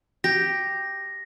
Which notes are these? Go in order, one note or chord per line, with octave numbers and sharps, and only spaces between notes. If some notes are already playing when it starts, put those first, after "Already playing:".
G4 A#6